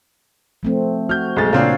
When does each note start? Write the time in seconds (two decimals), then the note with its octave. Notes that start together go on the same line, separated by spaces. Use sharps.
0.63 F3 A3 C4
1.09 F#4 F6 G6
1.36 B1 G#3 A6
1.53 A#2 C#3 C4 D4 C#5 F5